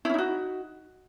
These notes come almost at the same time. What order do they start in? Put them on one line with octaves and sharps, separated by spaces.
E4 C#4 D#4 F#4